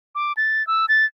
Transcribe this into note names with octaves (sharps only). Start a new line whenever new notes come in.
D6
A6
E6
A6